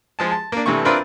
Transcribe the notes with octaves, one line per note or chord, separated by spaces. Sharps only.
F3 G#3 A5
A5
A#3 D4
G2 C3 E3 A3 C#6
C4 D4 E4 F4 A#4 B4